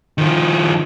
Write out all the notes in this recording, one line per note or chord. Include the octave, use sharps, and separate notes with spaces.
D#3 F3